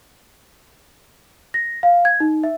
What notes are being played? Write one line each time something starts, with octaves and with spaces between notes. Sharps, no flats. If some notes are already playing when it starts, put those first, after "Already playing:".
A#6
F5
G#6
D#4
E5